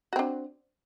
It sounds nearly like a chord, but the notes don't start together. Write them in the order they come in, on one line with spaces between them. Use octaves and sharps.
F#4 C4 D4